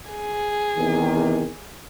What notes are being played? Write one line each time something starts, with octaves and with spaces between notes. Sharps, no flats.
G#4
E2 C3 D#3